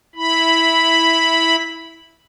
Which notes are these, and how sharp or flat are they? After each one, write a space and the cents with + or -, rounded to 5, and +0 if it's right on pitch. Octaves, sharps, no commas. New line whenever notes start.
E4 -10 B5 +0